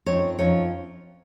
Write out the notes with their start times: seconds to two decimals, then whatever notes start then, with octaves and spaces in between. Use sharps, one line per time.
0.06 F#2 F3 C4 D#4 C#5
0.39 F#2 F3 C4 D#4 C#5